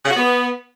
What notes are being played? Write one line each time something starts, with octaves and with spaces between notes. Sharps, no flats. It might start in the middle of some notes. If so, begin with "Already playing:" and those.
C#3
F#4
B3